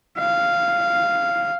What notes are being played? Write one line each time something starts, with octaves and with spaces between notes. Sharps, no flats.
F5